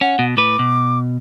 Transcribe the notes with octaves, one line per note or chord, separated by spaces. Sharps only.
C#4 F#5
B2
A2 B4 D6
B2